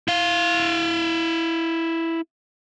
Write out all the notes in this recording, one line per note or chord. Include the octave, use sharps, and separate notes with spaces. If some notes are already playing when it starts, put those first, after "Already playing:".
E4 F5